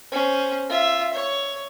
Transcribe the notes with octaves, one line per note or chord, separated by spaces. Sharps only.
C#4 C5
F4 E5
C#5